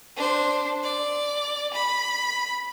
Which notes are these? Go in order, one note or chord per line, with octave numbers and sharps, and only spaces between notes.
D4 C5
D5
B5